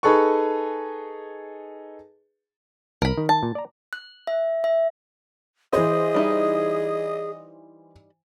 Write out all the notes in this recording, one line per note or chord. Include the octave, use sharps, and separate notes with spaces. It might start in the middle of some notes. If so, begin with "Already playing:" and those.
D#4 G#4 A4 B4 C#6
C2 A#4 B5
D#3
A5
A#2
D5 A#5
F#6
E5
E5
E3 G#4 C5 D#5
G3 D#4 E4